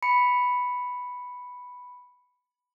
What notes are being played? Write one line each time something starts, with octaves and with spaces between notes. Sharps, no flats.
B5 C#7